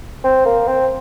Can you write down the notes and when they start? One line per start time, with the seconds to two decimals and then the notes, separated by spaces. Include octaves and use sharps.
0.24 C4
0.45 A#3
0.67 C4